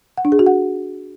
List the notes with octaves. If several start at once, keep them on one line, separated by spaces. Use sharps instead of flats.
F#5
D4
G#4
F#4
F#5